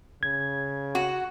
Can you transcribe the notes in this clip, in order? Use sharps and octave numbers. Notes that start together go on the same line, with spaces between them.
C#3 G#6
F#4